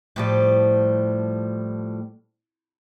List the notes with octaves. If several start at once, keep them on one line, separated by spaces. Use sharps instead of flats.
A2 F3 G3